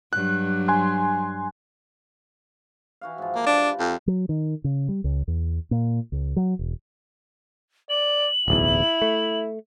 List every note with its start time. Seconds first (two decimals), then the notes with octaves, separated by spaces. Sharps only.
0.13 G2 F#3 F#6
0.68 G#5 C6 F#6
3.01 E3 F#4 F5
3.18 G#2 F3
3.35 A#3
3.46 D4 G4 B4 D5
3.79 F2 F#5
4.07 F#3
4.29 D#3
4.64 C#3
4.89 G3
5.04 C#2
5.28 E2
5.71 A#2
6.12 C#2
6.36 F#3
6.59 E1
7.90 D5 F#7
8.48 D1 B1 E2 E4
9.02 A3